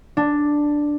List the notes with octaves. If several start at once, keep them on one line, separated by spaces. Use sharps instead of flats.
D4